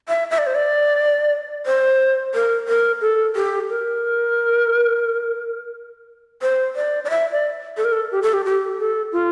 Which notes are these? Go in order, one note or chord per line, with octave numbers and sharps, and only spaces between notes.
E5
E5
D5
C5
D5
C5
A#4
A#4
A4
G4
A#4
C5
D5
D5
E5
D5
A4
A#4
A4
G4
A4
G4
G4
A4
F4